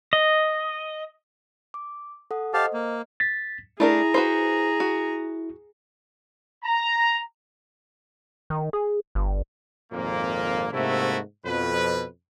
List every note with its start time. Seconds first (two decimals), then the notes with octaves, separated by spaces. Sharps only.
0.13 D#5
1.74 D6
2.31 A4 F#5 D#6
2.54 G4 C5 D#5 F5 A5
2.73 A#3
3.20 A6 B6
3.80 A3 D4 E4 G#4 A#4 A#5
4.14 F#4 B4 C5
4.80 F#4
6.64 A#5
8.50 D#3
8.73 G#4
9.15 G1
9.92 G#1 F2 A#2 A#3
10.72 G#2 C3 A3 A#3 E4 F#4
11.44 F2 B2 B4